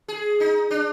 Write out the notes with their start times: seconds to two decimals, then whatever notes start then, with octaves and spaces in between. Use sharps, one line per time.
0.08 G#4
0.40 D#4
0.71 D4